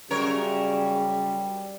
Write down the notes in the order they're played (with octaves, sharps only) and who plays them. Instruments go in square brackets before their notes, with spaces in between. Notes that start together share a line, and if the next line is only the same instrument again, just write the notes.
[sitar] F#2 A#4 C#5 [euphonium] C#3 [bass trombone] G3